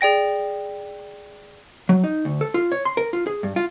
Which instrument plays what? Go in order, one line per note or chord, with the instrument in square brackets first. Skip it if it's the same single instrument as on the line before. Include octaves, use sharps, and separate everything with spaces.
[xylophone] G#4 D5 G5 A#6
[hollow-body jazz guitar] F#3
D#4
D2
A4
F4
C#5
C6
A#4
F4
G#4
G2
F4